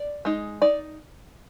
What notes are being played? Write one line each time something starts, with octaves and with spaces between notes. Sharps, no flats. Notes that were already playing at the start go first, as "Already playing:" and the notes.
Already playing: D5
G#3 D#4
D#4 D5